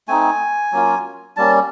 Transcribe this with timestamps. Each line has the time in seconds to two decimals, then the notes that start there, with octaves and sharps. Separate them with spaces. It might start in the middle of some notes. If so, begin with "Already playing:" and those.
0.08 A3 C4 D#4 G#5
0.72 F#3 A#3 C#4 F4
1.36 G3 A#3 C#4 A5